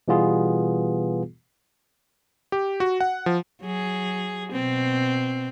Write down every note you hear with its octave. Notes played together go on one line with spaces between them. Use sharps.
B2 E3 G3 B3 F4 G#4
G4
F#4
F#5
F3
F#3 G#4
B2 C4